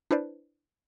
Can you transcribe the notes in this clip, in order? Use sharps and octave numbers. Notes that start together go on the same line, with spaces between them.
D4 E4 B4 C5 D5